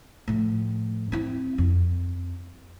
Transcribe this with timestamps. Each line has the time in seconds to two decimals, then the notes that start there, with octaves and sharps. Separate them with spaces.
0.28 A2 F3
1.12 C4 E4
1.58 F2